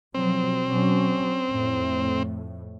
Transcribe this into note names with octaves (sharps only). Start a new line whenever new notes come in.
B2 F3 F#3 C4
B2 F#3 C#4
F2 A2